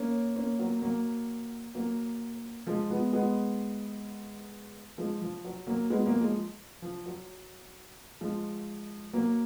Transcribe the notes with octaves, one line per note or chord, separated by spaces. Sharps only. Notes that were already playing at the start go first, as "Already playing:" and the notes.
Already playing: A#3 C#4
A#3 C#4
F#3 A#3
F#3 A#3
F#3 A#3
F3 G#3
G#3 B3
G#3 B3
F3 G#3
F3
F#3
F#3 A#3
G#3 B3
F#3 A#3
F3 G#3
F3
F#3
F3 G#3
F#3 A#3